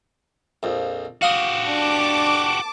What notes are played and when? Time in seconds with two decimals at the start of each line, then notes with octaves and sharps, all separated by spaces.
0.63 A#1 F2
1.22 F#4 G4 F5 C6 D#6
1.68 D4 A5 D6